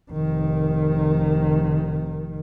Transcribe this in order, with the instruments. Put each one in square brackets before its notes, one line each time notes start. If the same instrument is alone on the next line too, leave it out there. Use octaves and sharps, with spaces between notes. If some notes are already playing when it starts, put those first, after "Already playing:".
[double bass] F1 D#3